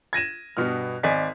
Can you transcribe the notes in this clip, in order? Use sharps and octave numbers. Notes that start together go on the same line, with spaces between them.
G#6 A#6 D#7 E7
G2 B2 B3 F6
G#1 D5 D#5 G#5 B6